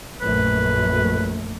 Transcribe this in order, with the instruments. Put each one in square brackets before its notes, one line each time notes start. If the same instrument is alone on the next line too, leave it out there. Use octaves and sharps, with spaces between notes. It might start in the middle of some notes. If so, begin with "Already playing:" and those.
[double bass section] A#1 F#2 A3 [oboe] B4